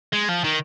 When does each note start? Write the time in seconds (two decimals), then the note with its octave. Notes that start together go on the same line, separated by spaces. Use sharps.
0.13 G#3
0.28 F3
0.44 D#3